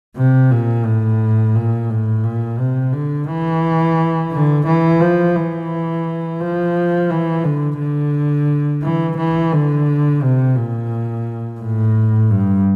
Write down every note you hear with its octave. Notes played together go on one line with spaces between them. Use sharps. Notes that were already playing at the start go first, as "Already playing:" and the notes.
C3
A#2
A2
A#2
A2
A#2
C3
D3
E3
D3
E3
F3
E3
F3
E3
D3
D3
E3
E3
D3
C3
A#2
A2
G2